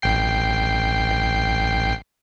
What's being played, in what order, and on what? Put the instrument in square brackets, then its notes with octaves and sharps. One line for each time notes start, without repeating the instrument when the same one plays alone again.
[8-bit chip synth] A1 G5 C7